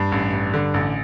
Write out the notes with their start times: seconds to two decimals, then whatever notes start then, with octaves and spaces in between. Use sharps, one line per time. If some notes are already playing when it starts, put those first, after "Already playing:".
Already playing: G2
0.12 A1
0.33 G2
0.54 D3
0.74 A1